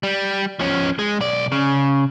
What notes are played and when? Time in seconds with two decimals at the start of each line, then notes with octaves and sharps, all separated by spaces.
0.03 G3
0.59 F3 C#4
0.99 G#3
1.20 B1 D5
1.52 C#3